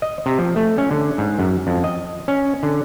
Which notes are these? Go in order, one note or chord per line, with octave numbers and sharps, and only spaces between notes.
D#5
C3
F3
A3
C#4
D3
G#2
F#2
F2
D#5
C#4
D3